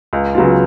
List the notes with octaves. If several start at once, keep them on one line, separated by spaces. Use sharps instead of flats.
C#2
C#3 F#3 B3 F4